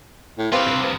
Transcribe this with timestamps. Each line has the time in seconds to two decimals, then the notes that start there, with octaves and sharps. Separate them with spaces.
0.38 A2
0.52 C4 F4 G4 B4 C#5 F5
0.67 G2 C3
0.82 G2 F3 D#6